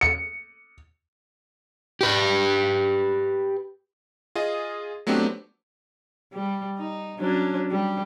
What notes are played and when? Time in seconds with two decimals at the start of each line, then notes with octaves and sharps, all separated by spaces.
0.01 C#7
2.01 G4 B4
4.35 F4 G#4 D#5
5.07 F#3 A3 B3 C4 D4 G4
6.34 G3
6.78 D#4
7.19 F#3 C#4 D4
7.70 G3